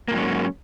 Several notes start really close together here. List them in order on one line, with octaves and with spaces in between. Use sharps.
A#3 G#2 F#3 C#4